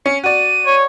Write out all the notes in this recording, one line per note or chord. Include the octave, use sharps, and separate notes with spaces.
C#4 C#7
F#4 D5 D#7
C#5